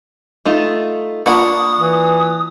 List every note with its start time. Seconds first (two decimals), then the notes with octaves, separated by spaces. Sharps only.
0.45 A3 D#4 F4
1.26 A#3 D4 F4 F#5 B5 C#6 D#6
1.78 E3